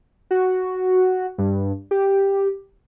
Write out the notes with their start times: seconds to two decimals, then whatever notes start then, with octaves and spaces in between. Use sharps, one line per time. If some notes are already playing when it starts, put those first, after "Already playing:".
0.31 F#4
1.38 G2
1.91 G4